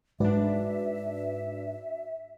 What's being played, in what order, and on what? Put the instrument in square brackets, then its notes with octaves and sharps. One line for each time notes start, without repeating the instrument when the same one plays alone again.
[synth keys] G#2 D4 [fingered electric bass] G#3 [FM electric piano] F#4 B4 D5 [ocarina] E5